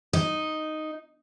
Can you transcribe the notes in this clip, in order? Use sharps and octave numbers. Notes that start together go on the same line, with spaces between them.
D#4